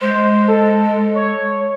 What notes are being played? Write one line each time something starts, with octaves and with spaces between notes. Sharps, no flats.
G#3 C5
A4
C#5